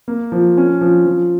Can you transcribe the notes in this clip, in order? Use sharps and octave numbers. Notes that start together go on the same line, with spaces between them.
A#3
F3
C#4
F3
F3